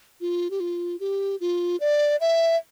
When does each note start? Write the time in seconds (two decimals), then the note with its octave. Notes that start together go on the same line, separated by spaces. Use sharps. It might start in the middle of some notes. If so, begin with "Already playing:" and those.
0.21 F4
0.50 G4
0.60 F4
1.00 G4
1.40 F4
1.80 D5
2.21 E5